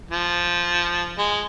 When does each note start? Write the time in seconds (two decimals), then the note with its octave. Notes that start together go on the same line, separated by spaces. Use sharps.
0.11 F3
1.18 G#3